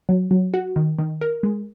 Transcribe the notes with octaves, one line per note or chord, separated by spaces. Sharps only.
F#3
F#3
F#4
D#3
D#3
A#4
G#3